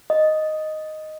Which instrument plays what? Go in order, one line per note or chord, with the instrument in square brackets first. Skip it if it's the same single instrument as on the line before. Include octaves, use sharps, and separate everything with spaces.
[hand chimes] D#5